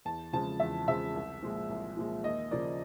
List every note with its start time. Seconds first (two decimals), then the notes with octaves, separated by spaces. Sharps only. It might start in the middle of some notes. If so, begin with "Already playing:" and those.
0.05 E2 A5
0.33 C#3 F3 G#3 C4 A5
0.60 E2 E5
0.88 C#3 F3 G#3 C4 E5
1.15 C2
1.42 A#2 F3 G#3
1.70 C2
1.97 A#2 F3 G#3
2.24 D#2 D#5
2.51 C#3 F3 A#3 D5